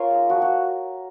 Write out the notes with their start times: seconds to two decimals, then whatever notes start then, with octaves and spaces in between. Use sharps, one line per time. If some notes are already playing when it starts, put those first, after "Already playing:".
Already playing: F4 A#4 C#5 G#5
0.11 G#3 D#4
0.30 F3 F#4
0.42 F#4